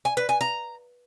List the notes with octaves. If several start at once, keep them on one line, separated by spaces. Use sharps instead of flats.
G#5
B4
G#5
A#5